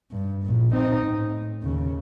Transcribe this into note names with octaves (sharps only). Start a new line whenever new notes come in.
G2
A#1 A#2
C4 D#4
A2
D#2 C#3